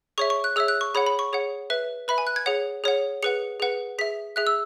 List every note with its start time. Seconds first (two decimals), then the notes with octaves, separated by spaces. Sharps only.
0.18 G#4 C#5 E5 C#6
0.30 C#6
0.44 F#6
0.56 G#4 C#5 E5 E6
0.68 F#6
0.81 C#6
0.94 G#4 C#5 F#5 B5
1.06 B5
1.19 C#6
1.33 G#4 C#5 F#5
1.70 B4 E5
2.08 B4 E5 B5
2.18 G#5
2.27 F#6
2.36 G#6
2.46 G#4 C#5 F#5
2.84 G#4 C#5 F#5
3.23 G#4 B4 F#5 C#7
3.60 G#4 B4 F#5
3.99 G#4 E5 B6
4.36 G#4 E5 F#6
4.47 E6